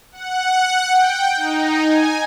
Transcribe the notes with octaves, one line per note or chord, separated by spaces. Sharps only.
F#5
G5
D#4
G#5